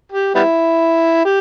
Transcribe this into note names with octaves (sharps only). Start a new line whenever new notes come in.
G4
G3 B3 E4
G4